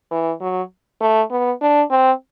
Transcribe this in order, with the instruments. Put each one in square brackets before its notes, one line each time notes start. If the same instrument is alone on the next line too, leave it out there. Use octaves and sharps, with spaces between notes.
[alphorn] E3
F#3
A3
B3
D4
C4